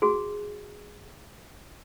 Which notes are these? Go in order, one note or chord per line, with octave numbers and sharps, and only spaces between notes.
F#4 G#4